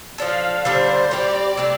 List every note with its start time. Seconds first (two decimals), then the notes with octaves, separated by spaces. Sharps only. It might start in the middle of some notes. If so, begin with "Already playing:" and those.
0.18 F3 D4 A4 F5
0.64 D3 G3 D4 C5
1.11 G3 C4 G4 D5
1.57 C3 A3 D4 G4